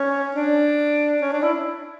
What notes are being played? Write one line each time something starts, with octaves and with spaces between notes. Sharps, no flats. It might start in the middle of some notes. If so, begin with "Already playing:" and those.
Already playing: C#4
D4
C#4
D4
E4